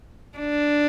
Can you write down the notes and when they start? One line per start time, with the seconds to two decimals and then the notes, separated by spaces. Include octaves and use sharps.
0.38 D4